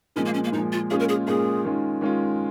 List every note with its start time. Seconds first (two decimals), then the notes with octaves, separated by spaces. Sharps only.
0.16 A#2 F3 G#3 C#4
0.25 A#3
0.34 C#4
0.44 A#3
0.52 A#2 F3 G#3 D#4
0.72 F4
0.90 A#2 G#3 C#4 F4 G#4
1.00 A#4
1.09 G#4
1.27 A#2 G#3 C#4 F4 G#4
1.65 D#3 G#3 C#4 F4
2.01 D#3 G#3 C#4 F4